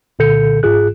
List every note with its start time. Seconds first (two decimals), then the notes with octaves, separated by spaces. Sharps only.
0.19 C2 A#2 D3 A4 G6 C#7
0.63 G1 G#2 F4 G#4 F#6